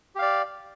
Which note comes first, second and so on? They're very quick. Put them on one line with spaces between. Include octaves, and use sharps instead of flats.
G4 F5 D5